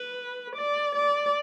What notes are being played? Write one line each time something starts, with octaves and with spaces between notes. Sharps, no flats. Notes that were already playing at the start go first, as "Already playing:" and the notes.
Already playing: B4
D5
D5